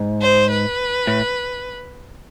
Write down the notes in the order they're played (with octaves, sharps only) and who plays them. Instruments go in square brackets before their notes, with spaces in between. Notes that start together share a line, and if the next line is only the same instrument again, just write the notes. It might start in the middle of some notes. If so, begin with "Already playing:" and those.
Already playing: [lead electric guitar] G#2
[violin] C5
B4
[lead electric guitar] A2